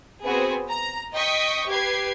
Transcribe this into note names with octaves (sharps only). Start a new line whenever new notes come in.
B3 C4 F#4 G#4 C5
A#5
D#5 G5 C#6 D#6 B6
G4 B4 G#6 C7